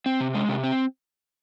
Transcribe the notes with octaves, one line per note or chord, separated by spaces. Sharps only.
C4
C3
G#3
C3
C4